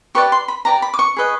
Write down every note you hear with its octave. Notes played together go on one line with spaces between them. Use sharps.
G4 B4 D5 C#6
C6
B5
G4 B4 D5 A#5
B5
D6
C#6
G#4 B4 D#5